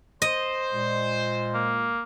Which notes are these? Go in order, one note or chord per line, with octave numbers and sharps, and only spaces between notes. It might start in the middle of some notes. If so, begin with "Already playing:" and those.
C5 D#5
A#2 G#3
A#3